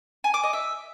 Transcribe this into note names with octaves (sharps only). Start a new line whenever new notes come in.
G#5
D6
D#5
E5